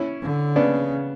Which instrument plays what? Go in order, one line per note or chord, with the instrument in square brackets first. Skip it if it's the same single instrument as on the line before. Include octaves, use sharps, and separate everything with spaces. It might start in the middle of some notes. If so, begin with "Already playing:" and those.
Already playing: [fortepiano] C#4 E4
[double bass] D3
[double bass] C#3 [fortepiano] B3 D4